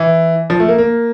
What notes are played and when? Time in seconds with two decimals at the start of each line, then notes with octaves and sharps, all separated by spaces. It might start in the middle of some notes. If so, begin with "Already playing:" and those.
Already playing: E3
0.50 F3
0.60 A3
0.68 A#3
0.78 A#3